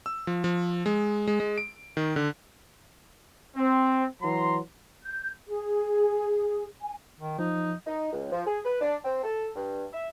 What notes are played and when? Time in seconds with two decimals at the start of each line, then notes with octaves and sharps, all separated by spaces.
0.06 E6
0.27 F3
0.44 F3
0.86 G#3
1.27 G#3
1.40 G#3
1.58 D7
1.97 D#3
2.16 D3
3.57 C4
4.22 E3 F#3 A#5 C6
5.03 G6
5.49 G#4
6.82 G#5
7.20 D#3
7.39 F3 D#4
7.87 D#4
8.13 C#2
8.32 F3
8.46 G#4
8.65 B4
8.81 D4
9.04 C4
9.23 A4
9.55 G2
9.93 E5